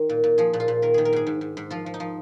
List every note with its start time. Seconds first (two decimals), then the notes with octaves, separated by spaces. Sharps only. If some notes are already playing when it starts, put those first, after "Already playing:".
Already playing: D#3
0.09 A#2
0.24 A#2
0.38 F3 G#4
0.53 A#2
0.60 F4
0.68 A#2
0.82 D#3 A#4
0.94 D#3 G#4
1.05 A#4
1.13 G#2 G#4
1.27 G#2
1.41 G#2
1.57 G#2
1.70 F3 F4
1.86 F3
1.94 D#4
2.00 F3